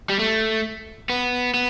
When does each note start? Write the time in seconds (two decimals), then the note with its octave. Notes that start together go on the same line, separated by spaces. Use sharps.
0.09 G3
0.19 A3
1.10 B3
1.54 B3